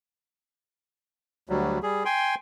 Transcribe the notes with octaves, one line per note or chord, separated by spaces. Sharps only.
D2 F#3 G3
G3 G#4
G5 G#5 C6